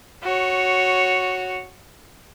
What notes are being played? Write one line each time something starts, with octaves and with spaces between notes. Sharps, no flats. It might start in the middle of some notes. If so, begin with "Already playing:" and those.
F#4 C#5